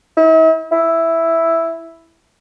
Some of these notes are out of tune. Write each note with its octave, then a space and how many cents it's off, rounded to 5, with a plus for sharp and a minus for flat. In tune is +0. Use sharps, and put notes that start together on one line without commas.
E4 -45
E4 +0